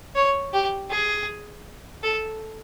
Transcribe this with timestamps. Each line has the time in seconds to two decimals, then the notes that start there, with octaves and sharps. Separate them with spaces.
0.15 C#5
0.53 G4
0.90 G#4
2.03 A4